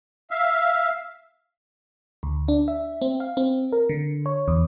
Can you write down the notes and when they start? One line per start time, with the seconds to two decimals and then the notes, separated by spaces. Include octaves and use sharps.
0.31 E5 F5
2.23 D2
2.48 D4
2.68 E5
3.02 C4
3.20 F5
3.37 C4
3.72 A#4
3.89 D3
4.26 C#5
4.48 E2